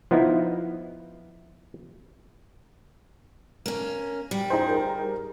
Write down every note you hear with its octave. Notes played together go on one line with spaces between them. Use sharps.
F3 B3 D#4 E4
A#3 C#4
G3
D#4 G#4 C5
G#4 A#4